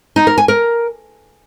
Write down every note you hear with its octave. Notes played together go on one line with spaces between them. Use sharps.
D#4
A#4
G#5
A#4